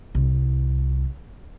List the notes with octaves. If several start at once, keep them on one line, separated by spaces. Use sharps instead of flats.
C2